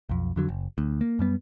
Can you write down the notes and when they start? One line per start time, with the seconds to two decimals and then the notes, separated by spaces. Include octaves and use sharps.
0.09 B1 F2
0.36 F2 D3 F#3
0.49 F#1
0.78 D2
1.01 A#3
1.19 F#2 G3 B3